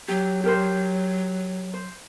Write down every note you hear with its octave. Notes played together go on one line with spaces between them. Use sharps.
F#3 G4
G4 A#4 C5
C5